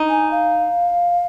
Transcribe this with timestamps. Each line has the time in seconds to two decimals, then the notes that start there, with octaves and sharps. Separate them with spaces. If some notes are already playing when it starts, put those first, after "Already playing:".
Already playing: D#4
0.09 G#5
0.31 F5